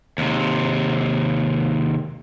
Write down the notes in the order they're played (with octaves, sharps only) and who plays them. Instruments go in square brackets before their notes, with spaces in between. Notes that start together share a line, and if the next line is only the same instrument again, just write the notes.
[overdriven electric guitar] D#2 C3